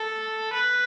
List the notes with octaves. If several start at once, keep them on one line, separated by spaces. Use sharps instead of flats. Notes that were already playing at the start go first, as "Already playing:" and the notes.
Already playing: A4
B4